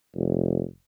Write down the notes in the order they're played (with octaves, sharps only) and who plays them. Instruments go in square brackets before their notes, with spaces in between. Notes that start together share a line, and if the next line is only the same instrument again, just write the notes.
[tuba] F1